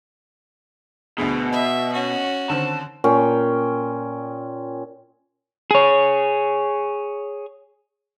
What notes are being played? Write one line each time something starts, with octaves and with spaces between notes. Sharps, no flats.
D2 B2 D3 G#4
D#5 E5
C#4 F#4
D3 D#3 C4 A5
A#2 C#4 G5
G#4 C#5